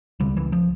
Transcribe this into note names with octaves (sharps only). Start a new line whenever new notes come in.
C#2 C#3 G3
E3
F3